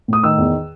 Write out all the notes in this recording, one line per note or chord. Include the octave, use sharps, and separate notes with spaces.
A2 D#6
D#3 E6
E2